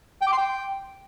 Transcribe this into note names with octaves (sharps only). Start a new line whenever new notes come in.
G5
D6
C6
G5